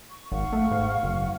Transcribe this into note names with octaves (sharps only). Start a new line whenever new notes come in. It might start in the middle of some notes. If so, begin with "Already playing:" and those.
C#6
G#1 F5 F#5 C#6
A3
G#2
F#1